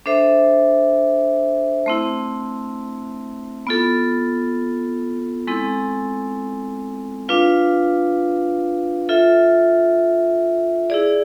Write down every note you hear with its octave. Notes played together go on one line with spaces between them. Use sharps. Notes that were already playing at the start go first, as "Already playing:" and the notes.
D4 A4 C5 E5
A3 C4 E4
B3 F4 A4
G#3 C4 E4 A4
D4 F4 B4 F5
F4 A4 E5
E4 G#4 D5